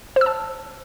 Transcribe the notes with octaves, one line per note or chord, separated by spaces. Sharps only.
C5 A5 E6